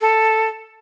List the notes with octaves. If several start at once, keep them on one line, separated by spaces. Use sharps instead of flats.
A4